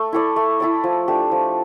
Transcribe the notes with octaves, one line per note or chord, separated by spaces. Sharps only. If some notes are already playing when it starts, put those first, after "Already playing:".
Already playing: A3
E4 A4 D5
A3
E4 A4 D5
F3
A3 D4 G4
F3